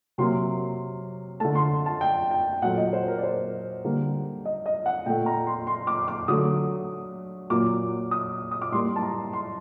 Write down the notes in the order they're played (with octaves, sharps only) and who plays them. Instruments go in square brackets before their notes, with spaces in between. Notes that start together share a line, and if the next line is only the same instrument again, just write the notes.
[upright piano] C3 F#3 A#3 C6
D3 A3 A5
C6
A5
G5
G5
A#2 F#3 A3 F#5
D#5
C5
A#4
D5
C5
D3 G3 A#3
D#5
D#5
F#5
A#2 A3 G5
A#5
C6
C6
D6
D6
D3 F#3 A3 D#6
A#2 F#3 A#3 D6
D#6
D#6
D6
A2 G3 A#3 C6
A5
A#5
C6